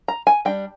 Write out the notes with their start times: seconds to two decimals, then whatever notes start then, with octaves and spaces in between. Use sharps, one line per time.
0.08 A#5
0.27 G#5
0.45 G3 D4 G5